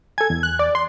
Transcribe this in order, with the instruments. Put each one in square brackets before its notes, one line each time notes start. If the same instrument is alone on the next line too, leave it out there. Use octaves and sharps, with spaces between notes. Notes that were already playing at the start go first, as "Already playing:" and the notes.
[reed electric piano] A4 G#5 [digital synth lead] G#6
[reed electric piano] E2
[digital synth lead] F#6
D5
C6